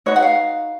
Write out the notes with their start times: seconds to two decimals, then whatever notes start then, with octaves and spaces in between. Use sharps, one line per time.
0.06 D#4 F#4 B4 C#5
0.16 F#5
0.22 F5